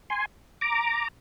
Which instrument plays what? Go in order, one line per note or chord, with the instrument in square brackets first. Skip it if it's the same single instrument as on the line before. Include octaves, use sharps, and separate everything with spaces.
[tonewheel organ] G#5 C6
A#5 D6